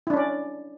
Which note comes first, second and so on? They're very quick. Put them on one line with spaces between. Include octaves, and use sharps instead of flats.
E4 D4 C#4 D5